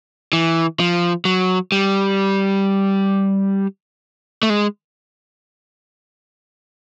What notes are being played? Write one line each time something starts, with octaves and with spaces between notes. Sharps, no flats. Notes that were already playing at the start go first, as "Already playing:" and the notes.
E3
F3
F#3
G3
A3
G#3